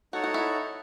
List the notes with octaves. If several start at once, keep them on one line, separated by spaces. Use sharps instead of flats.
D#4 F#4 A4 C#5 F#5
F#4
E4